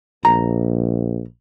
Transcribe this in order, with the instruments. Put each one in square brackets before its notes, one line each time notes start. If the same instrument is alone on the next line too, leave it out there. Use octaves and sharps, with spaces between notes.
[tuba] A#1 [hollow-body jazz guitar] A#5